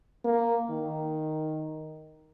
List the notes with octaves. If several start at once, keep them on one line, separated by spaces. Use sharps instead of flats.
A#3
D#3